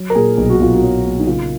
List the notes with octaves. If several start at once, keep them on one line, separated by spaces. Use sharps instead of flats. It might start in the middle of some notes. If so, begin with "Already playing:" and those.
Already playing: F#3
A#4
A#2 G#4
B1 G#4
F#4
B1 F4
F#4
F#3
A#2
D#4
C#3 F4